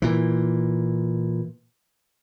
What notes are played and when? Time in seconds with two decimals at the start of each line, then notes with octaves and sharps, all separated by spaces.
0.02 A#2 E3